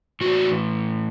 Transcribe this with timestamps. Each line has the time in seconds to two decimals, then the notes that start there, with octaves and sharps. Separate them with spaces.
0.21 A2 E3 F#4